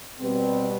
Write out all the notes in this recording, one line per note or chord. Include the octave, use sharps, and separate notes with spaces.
B2 G3 B3 C4